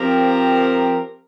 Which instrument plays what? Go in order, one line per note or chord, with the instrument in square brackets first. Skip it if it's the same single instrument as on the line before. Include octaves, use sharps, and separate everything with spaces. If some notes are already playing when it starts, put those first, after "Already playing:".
Already playing: [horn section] F3 C4 G4 A#4